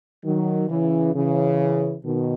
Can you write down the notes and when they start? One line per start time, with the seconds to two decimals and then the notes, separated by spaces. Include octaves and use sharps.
0.24 D#3 F#3
0.69 C#3 E3
1.14 C#3 E3
2.04 B2 D#3